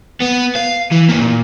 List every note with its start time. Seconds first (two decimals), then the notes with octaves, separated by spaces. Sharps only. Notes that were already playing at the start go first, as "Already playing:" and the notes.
0.20 B3
0.55 F5
0.91 E3
1.09 E3 A#3
1.21 A#2